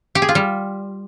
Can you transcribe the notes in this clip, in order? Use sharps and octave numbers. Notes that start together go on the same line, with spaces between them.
G4
G#4
F4
G3